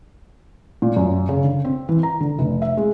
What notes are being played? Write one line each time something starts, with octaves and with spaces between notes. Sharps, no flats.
A#2
F#2
C#3
D3
C4
E3
A#5
D3
F1
E5
G#3